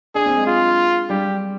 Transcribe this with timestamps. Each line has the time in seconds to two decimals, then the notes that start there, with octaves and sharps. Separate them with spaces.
0.15 D4 G#4
0.26 C4
0.36 G#3
0.47 F4
1.10 G3 G4